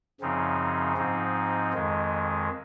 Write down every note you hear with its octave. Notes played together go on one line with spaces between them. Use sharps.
F#2 C#3 F3 C4 D#4
G#2 F3 C4 D#4
F2 D#3 G#3